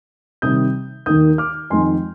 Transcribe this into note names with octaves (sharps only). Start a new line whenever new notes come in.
C3 D#3 G3 D#6 G6
D#2 D#3 A#3 D#4 D#6 G6
D6 F6
F2 D#3 G#3 D#4 G#5 C6